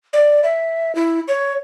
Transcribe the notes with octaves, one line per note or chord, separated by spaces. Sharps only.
D5
E5
E4
C#5